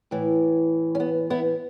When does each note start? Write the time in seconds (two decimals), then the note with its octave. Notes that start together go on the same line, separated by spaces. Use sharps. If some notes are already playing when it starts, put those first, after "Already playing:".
0.11 A2 E3
0.95 C#4
1.00 B3
1.30 B3 E4